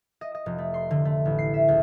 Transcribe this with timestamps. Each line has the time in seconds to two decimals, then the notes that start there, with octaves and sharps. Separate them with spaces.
0.21 D#5
0.35 D#5
0.46 F1
0.58 A3
0.74 C6
0.91 D3
1.05 A3
1.25 A1
1.39 C7
1.54 E5
1.68 C#2